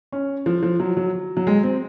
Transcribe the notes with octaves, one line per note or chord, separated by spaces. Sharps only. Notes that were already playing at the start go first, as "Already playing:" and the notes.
C#4
F3
F3
F#3
F#3
F#3
G#3
C4